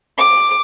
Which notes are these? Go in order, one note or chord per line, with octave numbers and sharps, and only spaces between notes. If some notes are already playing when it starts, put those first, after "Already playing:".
D6